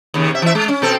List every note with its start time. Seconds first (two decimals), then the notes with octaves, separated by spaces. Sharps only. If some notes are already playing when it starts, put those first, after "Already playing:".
0.14 D#2 C#3
0.31 C3 E5
0.42 E3 E5
0.55 G#3
0.69 C#4
0.82 B2 C4 A4